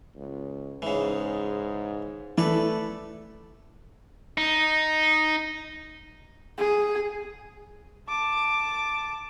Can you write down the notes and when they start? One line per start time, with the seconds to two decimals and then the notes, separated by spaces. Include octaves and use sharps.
0.15 C#2
0.82 G#2 C#3 E3
2.38 E3 A3 A4 B4 D5
4.38 D#4
6.58 G#4
8.09 A5 D6